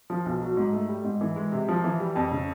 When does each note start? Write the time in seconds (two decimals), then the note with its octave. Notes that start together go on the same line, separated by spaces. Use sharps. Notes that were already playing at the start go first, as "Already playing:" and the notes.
0.10 F3
0.26 B1
0.41 F#3
0.57 G#2
0.73 A3
0.88 G3
1.04 G#2
1.21 E3
1.36 G#3
1.52 C3
1.68 F3
1.84 E3
2.00 G3
2.16 F2
2.32 C#3